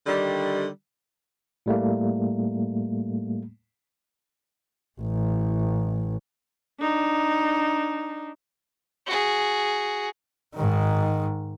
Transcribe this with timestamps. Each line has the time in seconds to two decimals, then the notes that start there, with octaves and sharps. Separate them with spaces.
0.07 D3 D#3 G3
1.66 A2 G3 A3 A#3
5.01 A1
6.80 D4 D#4
9.07 F#4 G#4
10.55 G#2 D#3